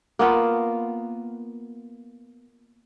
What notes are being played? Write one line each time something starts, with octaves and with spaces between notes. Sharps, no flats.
A#3 B3 F4